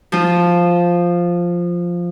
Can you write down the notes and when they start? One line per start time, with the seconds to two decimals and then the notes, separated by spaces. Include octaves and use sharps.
0.12 F3 F4